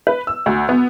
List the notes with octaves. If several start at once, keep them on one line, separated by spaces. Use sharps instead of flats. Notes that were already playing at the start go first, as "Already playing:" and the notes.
B4
E6
D2
B3